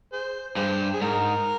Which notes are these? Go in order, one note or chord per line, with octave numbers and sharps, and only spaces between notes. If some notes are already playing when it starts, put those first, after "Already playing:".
G#4 C5
G2 G#4 C5
G#4
G#2 A#4